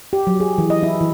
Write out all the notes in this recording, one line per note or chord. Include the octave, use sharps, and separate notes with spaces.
G4
F#3
G#4
E3
D#5
E4
E3